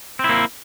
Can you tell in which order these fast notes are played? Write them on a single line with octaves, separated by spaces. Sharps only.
C4 E4 A#3